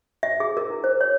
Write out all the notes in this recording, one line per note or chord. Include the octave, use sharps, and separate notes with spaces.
E5
G#4
A#4
E4
C5
C#5